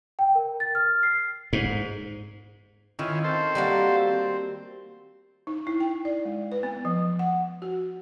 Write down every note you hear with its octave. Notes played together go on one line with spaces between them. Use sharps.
G5
A#4
A6
F6
C7
G#2
D#3 C#4 E4 F4
C4 A4 C5
G3 A#3 F#4
C4
D#4
E4
G5
D5
G#3
B4
B3
F3
F#5
F#4